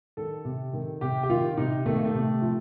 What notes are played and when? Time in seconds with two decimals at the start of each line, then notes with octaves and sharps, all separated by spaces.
0.17 D#3 A4
0.45 C3
0.73 D#3
1.01 C3 G4
1.23 G4
1.30 D#3 F4
1.57 C3 D#4
1.86 D#3 A3
1.95 A#3
2.05 A3
2.14 C3
2.42 F3